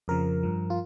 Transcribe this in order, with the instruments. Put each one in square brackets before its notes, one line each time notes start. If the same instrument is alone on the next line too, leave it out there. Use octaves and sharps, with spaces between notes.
[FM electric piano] F2 C#3 F3 A#4
G2 F3
F4